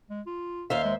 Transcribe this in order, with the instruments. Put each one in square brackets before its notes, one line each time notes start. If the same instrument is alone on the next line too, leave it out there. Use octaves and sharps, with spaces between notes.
[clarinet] G#3
F4
[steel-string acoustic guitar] D#2 C5 E5 [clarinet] F5
[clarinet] G#3